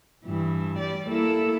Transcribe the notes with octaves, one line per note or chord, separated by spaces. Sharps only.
G2 E3
G3 D5
A#3 E4 A4